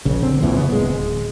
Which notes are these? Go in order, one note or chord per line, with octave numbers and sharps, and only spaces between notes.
A#1 C#3
D3 C4
C#2 F#2 A#2 E3
C#3 B3
D1 G#3